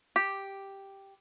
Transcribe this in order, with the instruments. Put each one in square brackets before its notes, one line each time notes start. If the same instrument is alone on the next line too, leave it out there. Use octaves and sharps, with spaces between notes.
[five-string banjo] G4